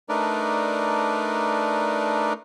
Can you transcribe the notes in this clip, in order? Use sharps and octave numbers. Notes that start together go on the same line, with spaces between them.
A3 D4 D#4 A#4 B4 D5